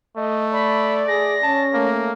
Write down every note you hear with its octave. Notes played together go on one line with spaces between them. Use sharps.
A3 D#5
D5 B5
G#4 A#6
C#4 A5
A3 A#3